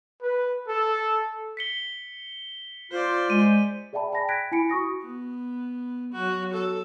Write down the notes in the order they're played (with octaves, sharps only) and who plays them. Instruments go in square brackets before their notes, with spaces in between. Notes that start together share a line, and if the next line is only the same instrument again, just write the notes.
[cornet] B4
A4
[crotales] B6 C#7 G7
[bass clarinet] F4 [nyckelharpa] C5 D5
[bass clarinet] G#3 [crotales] D#7
[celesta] G#4 D5 E5 G5 A5 B5
G5 G#5 B5 A#6
G5 F#6 G#6 A#6 B6 D7
E4 G#5 B5 C#7 D7
F#4 C#6 D#6 A#6
[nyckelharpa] B3
[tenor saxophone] F#3 [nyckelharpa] F#4
[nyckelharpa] A4